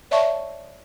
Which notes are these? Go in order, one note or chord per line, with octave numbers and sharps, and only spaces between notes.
C#5 D5 E5 A5 C#6